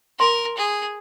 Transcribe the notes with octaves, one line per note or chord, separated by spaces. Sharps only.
A#4 C6
G#4